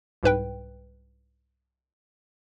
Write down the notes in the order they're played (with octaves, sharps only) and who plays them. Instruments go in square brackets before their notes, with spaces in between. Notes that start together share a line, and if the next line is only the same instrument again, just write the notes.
[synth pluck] C2 G#2 B4 G5